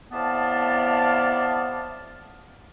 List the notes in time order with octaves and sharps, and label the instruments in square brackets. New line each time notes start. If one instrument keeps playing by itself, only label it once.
[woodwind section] A2 C3 B3 D5 F5 A5